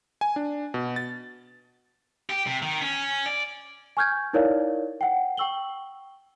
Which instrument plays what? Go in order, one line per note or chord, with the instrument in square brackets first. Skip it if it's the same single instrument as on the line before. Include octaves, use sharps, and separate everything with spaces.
[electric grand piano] G#5
D4
B2
A6
[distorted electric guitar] G4
C3
D#3
C#4
D5
[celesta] G#5 C#6 F6 G6 G#6
D#4 E4 A#4 C#5 D5 F5
F#5 G5
G5 C#6 E6 F#7 G7